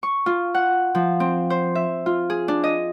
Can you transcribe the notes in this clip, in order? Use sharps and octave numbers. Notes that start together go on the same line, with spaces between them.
C#6
F4
F#5
F3
C4
C5
E5
F4
G#4
D4
D#5